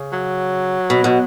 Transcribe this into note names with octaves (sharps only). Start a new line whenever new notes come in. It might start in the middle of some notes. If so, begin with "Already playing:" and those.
Already playing: C#3
F#3
B2
B2